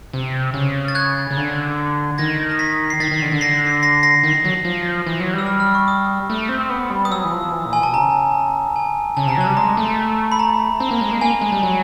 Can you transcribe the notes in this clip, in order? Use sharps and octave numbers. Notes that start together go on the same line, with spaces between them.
C3
C#3
A6
F#6 G#6
C#3
D3
D#3 G#6 A#6
A#6
A6 B6
C7
D#3 A6 B6
D#3
D3
D3
A#6 C7
A#6 C7
A#6 C7
D#3
F#3
F3
E3
F#3
G3
E6
F6
F6
C#6
D#6
A3
C4
B3
G3
D#6
F#3 E6
E3
F3
E3
A#2
G#5
B2 A5
C#3 A#5
G#5
C#3 A5
C3 A#5
F#3 A5
G3
G#3 A#5
A3
B5
A#5
C4
A#3
G#3
A#3
A#3 G#5
G#3
G3
F#3